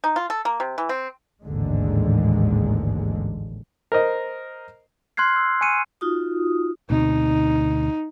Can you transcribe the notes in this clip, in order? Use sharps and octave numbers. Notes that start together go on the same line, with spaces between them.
D#4
F4
A4
A#3
C3
E3
C4
A1 D#2 G#2 D3 G#3
A#4 C5 D#5
C6 F6 F#6 G#6 C7
E6
G#5 C#6 F#6 C#7 D#7
D#4 F4 F#4 D#6
D2 B2 C4 D#4